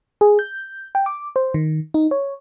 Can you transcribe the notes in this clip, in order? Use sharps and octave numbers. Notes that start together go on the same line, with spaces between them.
G#4
G6
G5
D6
C5
D#3
D#4
C#5